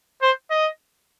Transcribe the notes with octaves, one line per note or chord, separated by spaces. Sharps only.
C5
D#5